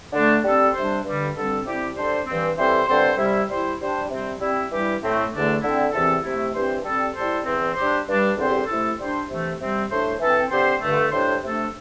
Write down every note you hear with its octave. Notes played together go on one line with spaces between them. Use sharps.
D3 A3 D4
G3 C4 A4
C3 G3 D4 C5
G2 D3 G3
G2 D3 G3 C4 A4
C3 G3 C4 E4 G4
G3 D4 A4 C5
G2 E3 C4
E3 G3 C4 A4 C5
G2 D3 C4 A4 C5
C3 G3 E4
G3 E4 C5
G3 D4 C5
C3 G3 C4
G3 C4 E4
G2 E3 G3 E4 G4
A2 A3 C4
E2 D3 A3 D4
D3 C4 E4
E2 C3 E3 C4 A4
C3 A3 E4
G2 E3 C4 G4 C5
G3 C4 A4
G3 E4 A4 C5
E2 E3 C4
G3 D4 G4 C5
G2 G3 D4
E2 D3 C4 G4 C5
C3 A3 E4 A4
G3 D4 C5
C3 E3 A3
C3 G3 C4
A2 A3 D4 C5
E3 C4 A4
D3 C4 G4 C5
G2 D3 A3
A2 G3 D4 C5
C3 A3 D4 A4